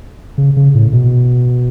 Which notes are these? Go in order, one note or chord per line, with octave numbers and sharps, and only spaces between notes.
C#3
C#3
A2
B2